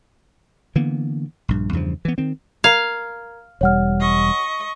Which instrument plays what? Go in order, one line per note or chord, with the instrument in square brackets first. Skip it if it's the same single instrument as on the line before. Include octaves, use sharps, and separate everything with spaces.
[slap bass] D3 E3 A#3 B3
A#1 G2
E2 G2 C#3 F3
E3 B3
D#3 C4
[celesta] A#4 A#5 G#6 [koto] F5
[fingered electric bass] E1 G3 [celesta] C#5 F#5 F6
[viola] D#5 C#6